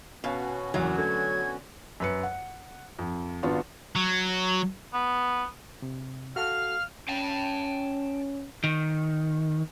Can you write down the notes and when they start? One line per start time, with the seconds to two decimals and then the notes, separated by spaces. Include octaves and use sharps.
0.24 B2 B3 C#4 F#4 F5
0.74 F#1 E2 E3 F#3
0.98 D3 A3 G#6
2.00 F#2 B4 C#7
2.23 F#5
2.99 F2
3.43 G#1 B3 D4 F4 F#4 F#5
3.96 F#3
4.94 B3
5.82 C3
6.36 F#4 A4 F5 F6
7.09 C#4 G5 A5
8.64 D#3